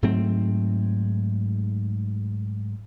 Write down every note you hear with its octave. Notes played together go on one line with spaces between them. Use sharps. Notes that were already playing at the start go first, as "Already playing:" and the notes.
G#2 F#3 A3 C4